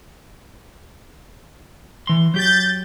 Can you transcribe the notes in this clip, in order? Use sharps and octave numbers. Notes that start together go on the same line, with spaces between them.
E3 C6
F#3 G4 G6 A6